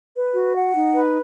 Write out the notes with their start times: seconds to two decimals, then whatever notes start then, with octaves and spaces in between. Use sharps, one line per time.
0.15 B4
0.34 F#4
0.55 F#5
0.74 D#4
0.94 B4